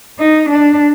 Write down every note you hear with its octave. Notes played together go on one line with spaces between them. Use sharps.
D#4
D4